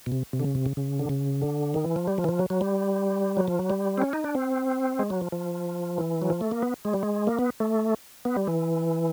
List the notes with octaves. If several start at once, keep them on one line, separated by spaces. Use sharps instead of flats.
B2
C3
C3
D3
C#3
C3
C#3
C#3
D3
C#3
D3
D#3
E3
F3
G3
F3
E3
F3
F#3
F#3
G3
F#3
F3
F#3
G3
C4
C#4
D#4
D4
C4
G#3
F#3
F3
F3
E3
F#3
F3
A3
A#3
B3
G#3
G3
G#3
A#3
B3
A3
B3
G3
E3